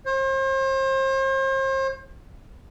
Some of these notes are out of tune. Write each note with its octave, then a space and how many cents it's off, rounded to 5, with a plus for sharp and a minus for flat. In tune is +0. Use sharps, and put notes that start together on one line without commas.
C5 +40